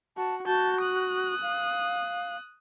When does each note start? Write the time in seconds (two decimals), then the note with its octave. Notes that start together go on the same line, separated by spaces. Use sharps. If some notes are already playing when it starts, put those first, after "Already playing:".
0.17 F#4 A5
0.46 F#4 A5 G6
0.82 D#6 F#6
1.42 F5